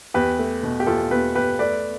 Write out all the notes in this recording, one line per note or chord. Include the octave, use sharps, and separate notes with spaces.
E2 G4 B4
A3
B2
G4
E2 F4 A4
E2 G4 B4
E2 G4 B4
A3 B4 D5